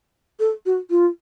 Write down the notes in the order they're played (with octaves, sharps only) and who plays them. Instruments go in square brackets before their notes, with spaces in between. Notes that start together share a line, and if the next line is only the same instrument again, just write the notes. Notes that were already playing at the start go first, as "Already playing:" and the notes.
[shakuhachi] A4
F#4
F4